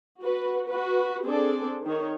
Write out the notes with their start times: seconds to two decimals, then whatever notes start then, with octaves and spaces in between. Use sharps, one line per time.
0.21 F#4 B4
0.67 F#4 B4
1.25 C4 D4 G#4 A4 D5
1.85 D#3 C#5